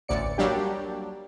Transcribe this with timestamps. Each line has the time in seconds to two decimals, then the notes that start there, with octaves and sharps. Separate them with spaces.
0.08 A1 D2 D5 C#7
0.38 F#3 G3 A#3 D4 G4